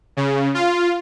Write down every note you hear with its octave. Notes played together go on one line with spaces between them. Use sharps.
C#3
F4